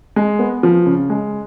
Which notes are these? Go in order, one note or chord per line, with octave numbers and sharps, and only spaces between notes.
G#3
B3
F3
C#3
G#3